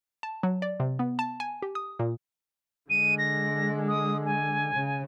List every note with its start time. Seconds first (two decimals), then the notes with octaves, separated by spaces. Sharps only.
0.23 A5
0.43 F#3
0.62 D5
0.80 C3
0.99 B3
1.19 A5
1.40 G#5
1.62 G4
1.75 D#6
1.99 A#2
2.90 D3 G#3 D#7
3.18 A#6
3.88 D#6
4.26 G#5
4.75 C#3